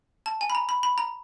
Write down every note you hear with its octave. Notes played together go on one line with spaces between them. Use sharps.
A5
G#5
B5
A#5
B5
B5
A#5